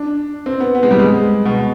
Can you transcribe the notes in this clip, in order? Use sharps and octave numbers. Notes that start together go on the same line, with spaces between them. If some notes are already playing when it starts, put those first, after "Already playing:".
Already playing: D4
C4
B3
B3
G#3
G3
G#3
B2